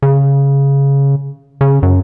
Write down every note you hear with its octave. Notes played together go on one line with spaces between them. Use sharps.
C#3
C#3
F#2